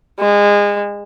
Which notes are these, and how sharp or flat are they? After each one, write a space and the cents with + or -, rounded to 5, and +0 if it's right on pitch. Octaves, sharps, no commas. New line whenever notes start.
G#3 -25